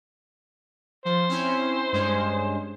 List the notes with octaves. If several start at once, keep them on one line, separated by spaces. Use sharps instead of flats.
F3 C5
C4 C#4 E4
G2 G#3 C#4